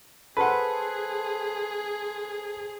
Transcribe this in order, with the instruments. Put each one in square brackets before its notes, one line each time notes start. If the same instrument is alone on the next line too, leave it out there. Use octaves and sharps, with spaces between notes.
[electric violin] G#4 [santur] A4 C5 [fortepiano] B4 F#5